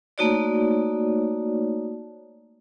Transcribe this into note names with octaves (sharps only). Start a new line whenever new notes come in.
A3 A#3 D#4 F#4 C#5 D5